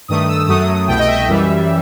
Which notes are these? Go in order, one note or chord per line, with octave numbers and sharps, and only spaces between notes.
G2 D#3 A3 D#6
E6
F#2 F#3 A3 D#6
C2 B2 A3 G5
D#5
E5
F#2 E3 G3